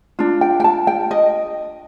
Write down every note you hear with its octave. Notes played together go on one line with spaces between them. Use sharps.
D4 F4
G5
G5
A5
G5
D#5